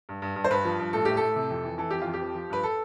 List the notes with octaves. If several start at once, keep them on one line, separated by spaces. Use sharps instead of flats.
G2
G2
G2
C5
G2 B4
F3
G2
A2 A4
A2 G4
A2 A4
C3
F2
E3
E3 A4
F2 G4
F4
F2
G4
F3
F3
G2 B4
A4